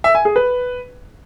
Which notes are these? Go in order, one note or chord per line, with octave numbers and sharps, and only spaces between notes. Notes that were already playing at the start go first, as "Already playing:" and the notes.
E5
G#5
G#4
B4